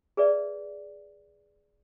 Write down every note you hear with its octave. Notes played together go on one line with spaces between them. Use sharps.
G#4 B4 D5 E5